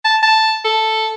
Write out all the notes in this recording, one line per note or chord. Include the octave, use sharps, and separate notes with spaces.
A5
A5
A4